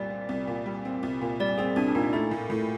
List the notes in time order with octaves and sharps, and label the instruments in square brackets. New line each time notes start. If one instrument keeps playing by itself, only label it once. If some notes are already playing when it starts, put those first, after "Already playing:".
Already playing: [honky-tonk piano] C2 A#2 G3 C4 [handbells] D5
[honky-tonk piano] C4
C2
A#2
G3
C4
C2
A#2
[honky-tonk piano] G3 [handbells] D5
[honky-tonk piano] C4 [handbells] G#4
[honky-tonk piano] C2 [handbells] D4
[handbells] D4
[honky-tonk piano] A#2 [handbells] D#4
[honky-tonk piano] A3 [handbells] E4
[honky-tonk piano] A2
A2